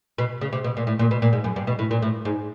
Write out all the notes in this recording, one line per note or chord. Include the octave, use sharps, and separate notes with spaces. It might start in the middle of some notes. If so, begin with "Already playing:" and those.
B2
C#3
C3
B2
A#2
A2
A#2
B2
A#2
G#2
F#2
G2
B2
A2
A#2
A2
G#2